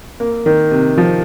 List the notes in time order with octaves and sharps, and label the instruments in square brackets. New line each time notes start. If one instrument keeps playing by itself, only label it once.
[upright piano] A#3
D#3
C3
F3